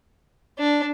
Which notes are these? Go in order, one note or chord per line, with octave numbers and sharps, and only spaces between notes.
D4